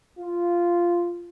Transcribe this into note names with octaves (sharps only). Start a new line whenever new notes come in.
F4